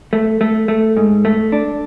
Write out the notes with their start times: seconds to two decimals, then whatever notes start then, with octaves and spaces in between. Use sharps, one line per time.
0.13 A3
0.41 A3
0.68 A3
0.97 G#2
1.25 A3
1.52 D4